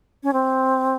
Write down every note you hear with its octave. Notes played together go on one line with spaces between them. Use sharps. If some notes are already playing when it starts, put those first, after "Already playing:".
C#4
C4